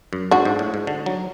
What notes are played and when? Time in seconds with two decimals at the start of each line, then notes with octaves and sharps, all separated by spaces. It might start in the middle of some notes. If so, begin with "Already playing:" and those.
0.13 F#2
0.31 G#2 D4 F#4
0.45 G#2
0.59 A2
0.74 G#2
0.87 D3
1.06 F#3